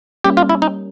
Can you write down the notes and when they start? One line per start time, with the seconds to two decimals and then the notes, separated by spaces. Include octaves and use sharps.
0.24 G3 A#3 C#4 G4
0.37 F4
0.49 E4
0.62 D#4